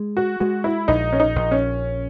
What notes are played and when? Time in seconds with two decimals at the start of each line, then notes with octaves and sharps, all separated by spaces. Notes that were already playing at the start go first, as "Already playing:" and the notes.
Already playing: G#3
0.17 F#4
0.40 G#3 F#4
0.64 E4
0.88 A#1 D#4
1.13 C#4
1.20 D#4
1.36 A#1
1.51 C#4